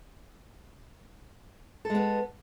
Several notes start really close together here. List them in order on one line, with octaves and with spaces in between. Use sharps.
A4 G#3 B3